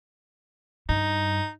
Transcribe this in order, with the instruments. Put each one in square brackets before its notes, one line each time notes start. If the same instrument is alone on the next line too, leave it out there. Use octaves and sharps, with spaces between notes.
[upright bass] G2 [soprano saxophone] D#4